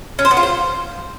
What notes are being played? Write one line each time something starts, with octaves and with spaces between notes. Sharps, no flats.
C#4
C5
B3
F4
C5